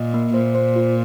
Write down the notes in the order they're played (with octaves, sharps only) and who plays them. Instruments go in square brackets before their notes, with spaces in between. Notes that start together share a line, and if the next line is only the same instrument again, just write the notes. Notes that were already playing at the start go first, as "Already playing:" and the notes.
Already playing: [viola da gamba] A#2 [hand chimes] D#5
[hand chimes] A#3
[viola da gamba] A#2 [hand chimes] C5
[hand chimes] C5
F4